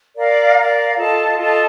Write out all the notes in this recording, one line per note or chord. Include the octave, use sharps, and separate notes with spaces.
A#4 D5 F5
A#4 D5 F5
F4 A4 D#5 A5
F4 A4 D#5 A5